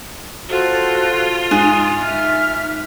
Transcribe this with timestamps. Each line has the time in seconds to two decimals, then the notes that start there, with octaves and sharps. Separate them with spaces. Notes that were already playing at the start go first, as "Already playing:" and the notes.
0.49 F4 F#4 A4 C5
1.51 G#2 G#4 C6
2.01 E5 F6